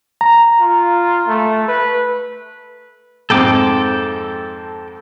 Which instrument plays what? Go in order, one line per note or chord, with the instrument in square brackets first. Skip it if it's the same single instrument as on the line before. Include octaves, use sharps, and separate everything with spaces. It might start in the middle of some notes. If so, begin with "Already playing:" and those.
[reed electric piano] A#5
[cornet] F4
A3
B4
[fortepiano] F2 G#2 C4 [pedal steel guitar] A4 G5 D6